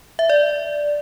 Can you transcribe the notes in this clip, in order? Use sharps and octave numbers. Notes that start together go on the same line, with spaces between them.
E5
D5